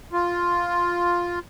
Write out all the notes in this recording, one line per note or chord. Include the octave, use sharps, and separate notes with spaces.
F4